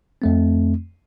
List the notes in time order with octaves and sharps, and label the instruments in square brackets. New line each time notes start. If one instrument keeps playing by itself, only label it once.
[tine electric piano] F2 A3 C4